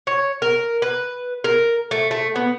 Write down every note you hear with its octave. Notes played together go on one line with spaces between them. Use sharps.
C#5
A#4
B4
A#4
A3
A3
B3